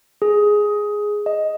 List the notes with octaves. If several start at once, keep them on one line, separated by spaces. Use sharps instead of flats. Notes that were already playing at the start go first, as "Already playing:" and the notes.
G#4
D#5